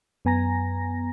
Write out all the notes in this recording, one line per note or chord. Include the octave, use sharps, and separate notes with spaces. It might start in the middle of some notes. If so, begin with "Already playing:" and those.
F#2 B3 G#5 A#5 A#6